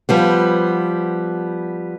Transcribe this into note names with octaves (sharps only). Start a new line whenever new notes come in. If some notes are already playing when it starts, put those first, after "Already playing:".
F3 G3 B3